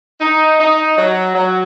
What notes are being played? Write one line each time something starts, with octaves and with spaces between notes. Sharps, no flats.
D#4
D#4
F#3
F#3